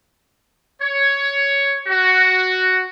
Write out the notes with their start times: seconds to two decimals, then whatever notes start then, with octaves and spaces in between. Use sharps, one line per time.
0.81 C#5
1.87 F#4